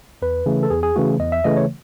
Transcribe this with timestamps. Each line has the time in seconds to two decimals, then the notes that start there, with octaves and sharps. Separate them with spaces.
0.22 E2 B4
0.46 C#3 E3 A3
0.63 A4
0.70 E2 G#4
0.83 G#4
0.96 C#3 E3 A3 F#4
1.20 E2 D#5
1.32 E5
1.44 C#3 E3 A3 D#5
1.57 C#5